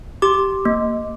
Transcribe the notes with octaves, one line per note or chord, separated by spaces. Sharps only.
G4 D6
A#3